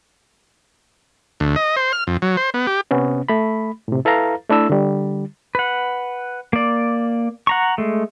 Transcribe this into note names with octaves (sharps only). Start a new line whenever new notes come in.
D2
D#5
C5
F6
F2
F#3
C5
B3
G4
C3 B3 C#4
A3 B5
A2 C3
E4 A4 B4 F5 A#5
A3 D4 E4 A4 E6
D3 G3
B4 F#5
A#3 D5
F#5 A#5 C#6
G#3 A3